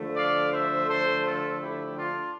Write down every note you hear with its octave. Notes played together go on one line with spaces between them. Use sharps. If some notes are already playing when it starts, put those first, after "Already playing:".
Already playing: D3 F3 A3
D5 F5
C5 E5
A4 C5
F4 A4
E4 G4
D4 F4